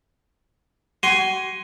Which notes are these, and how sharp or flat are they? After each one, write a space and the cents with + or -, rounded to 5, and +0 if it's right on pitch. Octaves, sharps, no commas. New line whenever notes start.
F#4 +35 G#5 +0 C6 +0